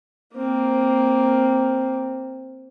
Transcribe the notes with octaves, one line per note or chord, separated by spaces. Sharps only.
A#3 C4